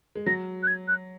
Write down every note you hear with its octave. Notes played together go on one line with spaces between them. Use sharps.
G#3
F#3 A#6
F#6
G#6
F#6